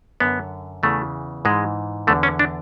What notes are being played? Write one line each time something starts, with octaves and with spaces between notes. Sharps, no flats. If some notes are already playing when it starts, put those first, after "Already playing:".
F#2 D3 B3
E2 C#3 E3 A3
G#2 E3 G#3
E2 D3 A3
C#4
D4